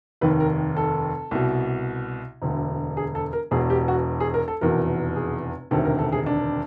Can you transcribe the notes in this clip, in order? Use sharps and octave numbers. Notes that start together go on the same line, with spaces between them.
F1 D#2 D#3 B4
A#4
A4
C2 B2
E1 D2 D3
G#4
A4
A#4
E1 E2 B2 G#4
G4
F#4
G#4
A#4
A4
F1 E2 B2 A#4
G#4
E1 D2 C3 D#3 A4
A#4
A4
G#4
D4